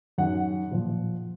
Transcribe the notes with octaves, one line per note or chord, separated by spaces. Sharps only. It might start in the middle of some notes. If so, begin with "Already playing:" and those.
F#2 D#3 F#5
A#2 F3